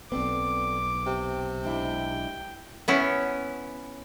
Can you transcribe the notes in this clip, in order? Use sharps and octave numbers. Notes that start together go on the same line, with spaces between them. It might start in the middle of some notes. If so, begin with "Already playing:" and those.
B1 B3 C4 A4 D5 D6
C3 G5
G#3 D4 E4 G5
B3 C#4 E4